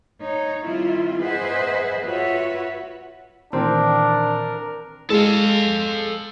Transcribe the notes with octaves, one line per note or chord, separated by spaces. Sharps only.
D#4 C#5
D#3 G3 C4 E4 F4
G#4 B4 C5 D#5 E5 F#5
F4 F#4 B4 C#5 E5 F#5
A#2 D#3 E3 C4 D4 A#4
G#3 A4 F5